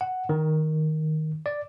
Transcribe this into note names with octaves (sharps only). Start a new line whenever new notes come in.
F#5
D#3
D5